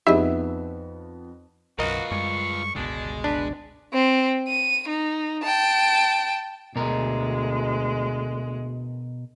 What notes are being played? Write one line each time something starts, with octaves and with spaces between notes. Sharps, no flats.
F2 B3 D#4 E4 G4 G#4 D#5 E5
B1 F#2 F4 F#4 A#4 B4 D#5
F#2 G3 G#3 C#6
G1 C#2 B2 G#3 D4
D4 B4
C4
D#7
D#4
G5 A5
D2 B2 G#3 A#4